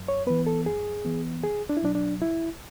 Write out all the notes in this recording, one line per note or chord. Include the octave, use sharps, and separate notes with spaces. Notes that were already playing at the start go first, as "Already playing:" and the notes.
Already playing: F#2
C#5
E3 B3 B4
A4
F#2 G#4
E3 B3
C#2 G#4
D4
E4
B2 F#3 D4
D4
C#2 E4